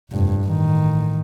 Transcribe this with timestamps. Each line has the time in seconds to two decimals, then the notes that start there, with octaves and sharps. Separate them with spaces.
0.11 F1 G2
0.44 A1 D#3